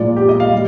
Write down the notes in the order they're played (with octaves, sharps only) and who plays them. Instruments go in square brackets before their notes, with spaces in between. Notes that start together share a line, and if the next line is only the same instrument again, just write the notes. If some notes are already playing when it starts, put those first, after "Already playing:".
Already playing: [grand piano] A#2 F3 G#3 D5
G4
D#5
F5
G3